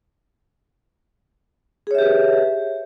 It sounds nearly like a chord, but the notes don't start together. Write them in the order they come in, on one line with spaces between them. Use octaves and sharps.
G#4 C#5 E5 G4 B4